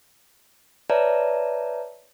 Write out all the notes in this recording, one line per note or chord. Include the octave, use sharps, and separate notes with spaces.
B4 C#5 D5 E5 A5 A#5